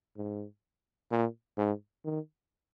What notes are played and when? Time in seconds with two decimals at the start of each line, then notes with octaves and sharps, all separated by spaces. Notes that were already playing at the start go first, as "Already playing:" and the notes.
0.17 G#2
1.11 A#2
1.58 G#2
2.05 D#3